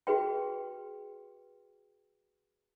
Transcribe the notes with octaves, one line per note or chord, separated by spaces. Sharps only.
F#4 G#4 B4 G5